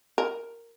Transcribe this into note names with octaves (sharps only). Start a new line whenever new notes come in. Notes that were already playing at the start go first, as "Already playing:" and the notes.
A#4